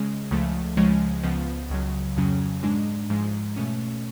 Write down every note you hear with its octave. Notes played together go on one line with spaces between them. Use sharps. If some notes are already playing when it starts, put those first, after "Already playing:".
Already playing: C#3 G#3 C#4
C#2 C#3 F3 A3
C#2 C#3 F3 G#3 C#4
C#2 C#3 F3 B3
C#2 C#3 F#3
F2 C#3 F#3 C#4
G#2 G#3 D4
G#2 F3 G#3
B2 A3 C#4